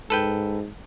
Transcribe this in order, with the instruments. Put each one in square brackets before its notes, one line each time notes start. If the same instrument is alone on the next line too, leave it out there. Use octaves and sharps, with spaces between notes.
[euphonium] G#2 [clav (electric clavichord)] A4 B4 G5